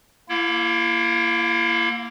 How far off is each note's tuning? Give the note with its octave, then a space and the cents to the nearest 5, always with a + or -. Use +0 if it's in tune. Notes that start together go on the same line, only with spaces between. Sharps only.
A#3 +0 E4 +35 F5 +45